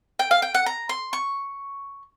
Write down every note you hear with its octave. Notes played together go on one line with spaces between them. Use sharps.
G5
F5
G5
F#5
A#5
C6
C#6